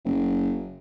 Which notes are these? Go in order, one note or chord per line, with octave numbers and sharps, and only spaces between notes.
F#1